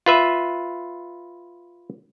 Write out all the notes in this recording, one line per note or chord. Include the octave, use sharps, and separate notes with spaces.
F4 B4 E5